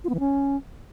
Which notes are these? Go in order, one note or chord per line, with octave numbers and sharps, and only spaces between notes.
F4
B3
E3
C#4